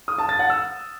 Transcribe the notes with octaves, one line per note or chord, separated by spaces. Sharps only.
D#6
A5
A6
F#5
E6